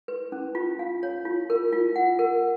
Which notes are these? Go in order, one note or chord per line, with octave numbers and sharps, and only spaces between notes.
B4
C#4
F4
F5
C#5
F4
A#4
F4
F#5
A#4